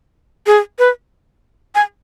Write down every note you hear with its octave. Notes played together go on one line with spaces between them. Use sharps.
G#4
B4
G#5